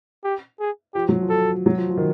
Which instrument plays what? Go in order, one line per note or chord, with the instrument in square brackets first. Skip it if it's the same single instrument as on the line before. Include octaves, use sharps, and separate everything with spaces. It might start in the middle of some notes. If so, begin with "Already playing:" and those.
[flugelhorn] G4
G#4
[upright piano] F3 [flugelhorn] G4
[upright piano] F#3
F3
[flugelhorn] A4
[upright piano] F#3
F3
F3
D#3